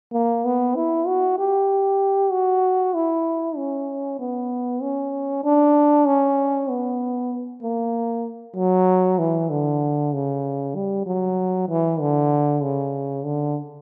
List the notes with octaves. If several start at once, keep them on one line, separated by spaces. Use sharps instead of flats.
A#3
B3
E4
F#4
G4
F#4
E4
C#4
B3
C#4
D4
C#4
B3
A#3
F#3
E3
D3
C#3
G3
F#3
E3
D3
C#3
D3